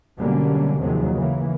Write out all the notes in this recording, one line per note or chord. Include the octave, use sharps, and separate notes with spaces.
B2 D3 F#3 G3 A#3 C#4
D#2 C3 D#3 F3 F#3 G#3
C#3 E3 A#3